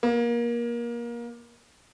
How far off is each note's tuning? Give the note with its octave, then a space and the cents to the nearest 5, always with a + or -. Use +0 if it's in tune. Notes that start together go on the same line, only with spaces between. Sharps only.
A#3 +25